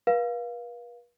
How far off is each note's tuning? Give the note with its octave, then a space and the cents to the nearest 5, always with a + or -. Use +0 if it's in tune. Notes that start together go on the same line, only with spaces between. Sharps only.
B4 -45 F5 +0